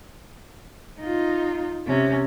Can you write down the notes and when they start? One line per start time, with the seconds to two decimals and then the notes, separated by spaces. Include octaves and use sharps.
1.00 D#4 F4
1.87 C3 C#4